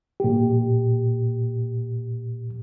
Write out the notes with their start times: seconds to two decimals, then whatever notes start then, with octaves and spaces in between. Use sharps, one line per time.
0.20 A#2 G4